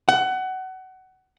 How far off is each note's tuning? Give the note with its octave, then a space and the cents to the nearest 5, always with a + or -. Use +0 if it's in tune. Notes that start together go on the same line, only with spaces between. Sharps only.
F#5 +25